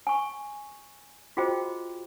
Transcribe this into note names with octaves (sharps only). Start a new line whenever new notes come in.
G#5 C#6
F4 F#4 G#4 C5 D#5 G5